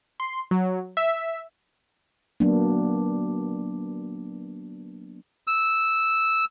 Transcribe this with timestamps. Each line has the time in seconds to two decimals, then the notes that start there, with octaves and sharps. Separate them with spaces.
0.20 C6
0.51 F#3
0.97 E5
2.40 F#3 A#3 B3 D4
5.47 E6